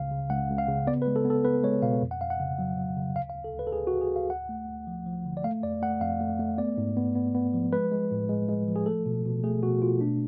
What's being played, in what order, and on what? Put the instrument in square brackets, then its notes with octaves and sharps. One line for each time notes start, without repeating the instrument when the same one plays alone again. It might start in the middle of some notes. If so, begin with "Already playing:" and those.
Already playing: [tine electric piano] C#2 C#3 F5
C#3
C#2 F#5
C#2
F5
C#3
B3 D5
B4
G#3
A4
B3
A4
B3 B4
G#3 C#5
B2 F5
F2
F#5
F2 F5
F#5
C#3
F#3
F#3
C#3
D2 F5
F5
D2
A4
D2
B4
A4
D2 G#4
F#4
D2
G#4
D2
F5
D2 F#5
A3
D2
F3
F3
D3
D5
A3 F5
F2 D5
A3 F#5
F2 F5
A3
A3
B3 D5
G#2
B3
B3
B3
F3
G#3 B4
G#3
A2
G#3
G#3
F3
G#4
A3 A4
B2
B2
A3 G#4
B2 F#4
B2 F4
A3 D4